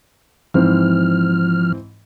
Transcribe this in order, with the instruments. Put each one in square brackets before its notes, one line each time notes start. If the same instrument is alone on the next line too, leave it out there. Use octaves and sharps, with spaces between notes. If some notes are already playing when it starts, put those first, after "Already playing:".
[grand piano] G#2 E3 C4 [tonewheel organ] F3 F6